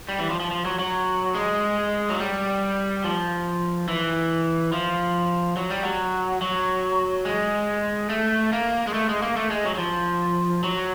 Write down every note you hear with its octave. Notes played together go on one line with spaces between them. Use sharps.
G3
E3
F3
F3
F3
F#3
F#3
G#3
F#3
G3
F3
E3
F3
F#3
G3
F#3
F#3
G#3
A3
A#3
G#3
A3
G#3
A#3
A3
G#3
F#3
F#3
F3
F#3